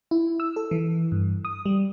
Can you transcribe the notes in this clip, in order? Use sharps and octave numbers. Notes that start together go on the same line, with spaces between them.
E4
E6
A4
E3
G2
D#6
G3